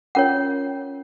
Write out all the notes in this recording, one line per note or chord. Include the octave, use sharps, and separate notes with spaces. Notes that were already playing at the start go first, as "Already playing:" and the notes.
C#4 F4 A#4 C#5 F#5